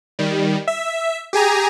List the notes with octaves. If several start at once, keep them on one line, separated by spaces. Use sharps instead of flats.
D#3 G3
E5
G4 G#4 G#5 A#5